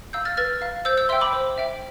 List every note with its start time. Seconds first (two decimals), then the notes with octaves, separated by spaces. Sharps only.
0.13 F5 E6 G6
0.25 F6 A6
0.37 B4 F6 A6
0.62 F5
0.85 C5 E6 G6
0.97 E6 G6
1.09 E5 G5 C6 E6
1.21 B5 D6
1.33 C5
1.58 E5 G5